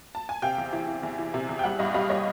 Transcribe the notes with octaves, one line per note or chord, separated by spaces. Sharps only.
A5
G#5
C3 F5 G5
E2
E3
E3
E2
E3
C3
E2
G5
G3 E5 F#5
G2 D#5 F5
G3 D#5 F5
G3 C#5 D#5